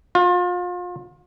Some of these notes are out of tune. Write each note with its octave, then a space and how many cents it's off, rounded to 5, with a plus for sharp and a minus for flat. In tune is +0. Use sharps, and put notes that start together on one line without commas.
F4 +35